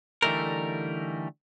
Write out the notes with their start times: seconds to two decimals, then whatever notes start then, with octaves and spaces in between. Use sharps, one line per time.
0.22 D3 E3 G3 A3 D#4 A#4